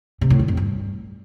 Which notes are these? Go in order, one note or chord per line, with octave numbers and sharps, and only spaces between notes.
C3
A2
D3
F2
G2